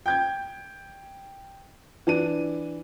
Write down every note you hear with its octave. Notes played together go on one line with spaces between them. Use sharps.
G5 G6 G#6
E3 D4 D#7